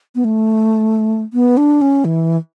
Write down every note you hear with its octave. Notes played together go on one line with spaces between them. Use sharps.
B3
A3
B3
D4
C#4
E3